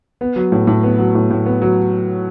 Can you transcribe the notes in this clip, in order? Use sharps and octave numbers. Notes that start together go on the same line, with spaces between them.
B3
F#3
A2
A2
B3
F#3
A2
A2
B3
F#3